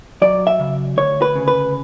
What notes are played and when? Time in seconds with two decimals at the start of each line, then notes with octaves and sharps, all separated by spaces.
0.22 F#3 D5
0.47 E5
0.60 C#3
0.97 D2 C#5
1.22 B4
1.36 C#3
1.48 B4